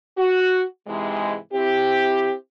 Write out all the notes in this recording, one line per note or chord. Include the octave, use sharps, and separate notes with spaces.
F#4
G#2 C3 E3 G#3
C4 E4 G4